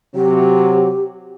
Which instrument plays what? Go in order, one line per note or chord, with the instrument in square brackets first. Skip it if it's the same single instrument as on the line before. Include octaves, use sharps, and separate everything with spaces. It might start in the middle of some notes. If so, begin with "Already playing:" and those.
[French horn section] C3 F#3 [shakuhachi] G4